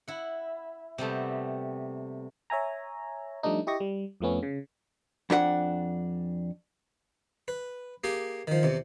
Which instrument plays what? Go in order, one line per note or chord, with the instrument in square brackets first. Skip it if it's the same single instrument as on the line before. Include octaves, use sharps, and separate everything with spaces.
[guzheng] E4 F#5
C3 G3 A3 B3
[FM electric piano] C#5 E5 G#5 A#5
F3 G3 A3 D4 D#4
E4 G4 D#5 C#6 A#6
G3
F2 F3 A3 B3 C#4
C#3
[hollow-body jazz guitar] F2 D4 A4 F#5
[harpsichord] B4
A#3 G4 G#4
D#3 F3
E2 C3